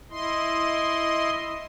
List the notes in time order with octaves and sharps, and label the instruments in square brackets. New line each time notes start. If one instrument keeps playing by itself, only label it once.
[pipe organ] E4 D#5 C6